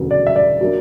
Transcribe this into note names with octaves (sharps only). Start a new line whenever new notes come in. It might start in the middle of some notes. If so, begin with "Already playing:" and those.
Already playing: E1 D2 C#3 F#3 B3
D5
E5
D5
F#3 A#3 D4